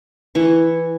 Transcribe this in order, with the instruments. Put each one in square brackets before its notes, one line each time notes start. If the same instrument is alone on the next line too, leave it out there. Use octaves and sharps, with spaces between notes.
[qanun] E3 C#6